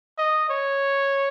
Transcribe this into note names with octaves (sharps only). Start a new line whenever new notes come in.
D#5
C#5